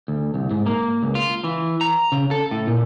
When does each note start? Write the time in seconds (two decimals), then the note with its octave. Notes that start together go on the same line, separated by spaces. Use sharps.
0.08 D2
0.34 C2
0.51 G#2
0.66 A#3
1.02 C#2
1.15 F4
1.44 E3
1.81 A#5
2.12 C#3
2.31 A4
2.51 A2
2.68 A#2